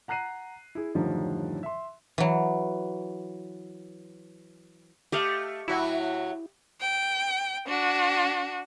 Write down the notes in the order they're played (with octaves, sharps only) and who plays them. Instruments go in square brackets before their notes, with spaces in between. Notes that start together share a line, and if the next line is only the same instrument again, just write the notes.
[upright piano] F#5 A#5 F#6 C7 D#7
E4 G#4
F#2 A2 D3 D#3 F3 G3
E5 C6
[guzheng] E3 F#3
[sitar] A3 [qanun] G4 D#5 F5
[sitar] A2 F#3 F#4 [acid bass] E4
[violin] G5
D4 F#4